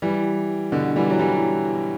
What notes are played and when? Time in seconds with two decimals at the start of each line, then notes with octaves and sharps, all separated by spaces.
0.02 E3 G3
0.72 B2 D3
0.96 E3 G3
1.10 F#3
1.19 E3 G3